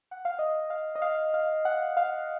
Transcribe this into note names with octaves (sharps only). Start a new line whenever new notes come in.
F#5
F5
D#5
F5
D#5
F5
F5
F#5
F5